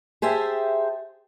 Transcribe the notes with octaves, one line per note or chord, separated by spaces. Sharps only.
G4 G#4 C5 E5 A5